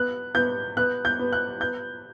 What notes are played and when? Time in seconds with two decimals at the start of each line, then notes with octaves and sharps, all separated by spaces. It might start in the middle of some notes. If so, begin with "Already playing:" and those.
Already playing: B3 F#6
0.35 B3 G6
0.77 B3 F#6
1.05 G6
1.19 B3
1.33 F#6
1.60 B3 G6